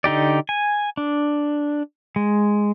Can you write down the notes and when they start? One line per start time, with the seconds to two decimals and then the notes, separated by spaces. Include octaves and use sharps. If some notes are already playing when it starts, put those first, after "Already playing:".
0.04 D3 D#4 G4 D5
0.49 G#5
0.97 D4
2.16 G#3